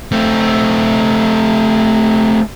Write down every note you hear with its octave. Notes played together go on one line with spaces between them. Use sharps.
A3 C4